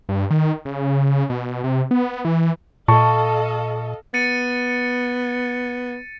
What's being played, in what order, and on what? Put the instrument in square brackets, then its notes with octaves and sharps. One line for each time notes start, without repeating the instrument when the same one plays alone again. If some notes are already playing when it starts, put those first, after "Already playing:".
[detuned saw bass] G2
D#3
C#3
B2
C3
B3
E3
[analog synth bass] A#2 [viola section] A4 D#5 F5 [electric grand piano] A5 C#6
[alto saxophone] B3 [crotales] A6 C#7 D#7